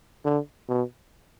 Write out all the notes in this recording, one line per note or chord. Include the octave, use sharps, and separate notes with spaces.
D3
B2